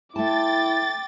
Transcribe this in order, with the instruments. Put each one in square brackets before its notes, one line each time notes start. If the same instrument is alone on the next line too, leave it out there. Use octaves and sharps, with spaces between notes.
[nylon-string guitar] A3 A5 [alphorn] E4 [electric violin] G5 D6 [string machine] A6